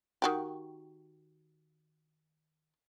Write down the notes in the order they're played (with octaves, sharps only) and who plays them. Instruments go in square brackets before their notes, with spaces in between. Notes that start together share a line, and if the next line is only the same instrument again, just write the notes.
[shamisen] D#3 F#4 G4